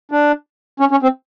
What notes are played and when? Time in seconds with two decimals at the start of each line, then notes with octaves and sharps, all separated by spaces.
0.11 D4
0.80 C#4
0.91 C#4
1.03 C4